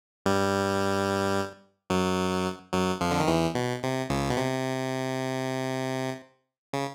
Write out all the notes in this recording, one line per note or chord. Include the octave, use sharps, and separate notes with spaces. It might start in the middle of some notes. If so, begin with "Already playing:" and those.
G2 G3
F#2 F#3
F#2 F#3
F2 F3
D3
D#3
E2 E3
B2
C3
C#2 C#3
B2
C3
C#3